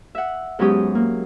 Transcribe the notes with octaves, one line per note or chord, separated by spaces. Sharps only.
E5 F#5
G#2 F#3 B3 C#4 G4 D#6
A#3